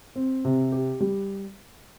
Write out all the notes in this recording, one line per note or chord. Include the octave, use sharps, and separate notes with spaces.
C4
C3
G4
G3